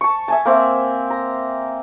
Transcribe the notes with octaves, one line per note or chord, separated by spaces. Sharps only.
A5 C#6
E5 G#5 A5
A#3 C4 E5
A#5